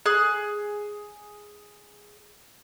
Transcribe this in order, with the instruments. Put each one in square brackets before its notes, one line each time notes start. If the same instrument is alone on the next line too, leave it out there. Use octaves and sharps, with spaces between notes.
[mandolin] G#4 F#6